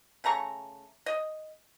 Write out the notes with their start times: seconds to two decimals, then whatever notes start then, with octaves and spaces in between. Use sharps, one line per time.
0.24 C#3 A3 A#5 C#6
1.06 D#5